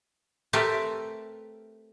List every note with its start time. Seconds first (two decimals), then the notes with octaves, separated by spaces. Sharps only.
0.53 A3 C4 G4 A#4 B4 E5